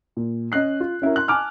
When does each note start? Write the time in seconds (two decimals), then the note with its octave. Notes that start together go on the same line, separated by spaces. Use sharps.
0.17 A#2
0.52 C#4 D#5 F#6 C7
0.80 F4
1.02 C#4 E4 F#4 A#4
1.16 C6 F#6
1.28 G#5 A5 D6 F6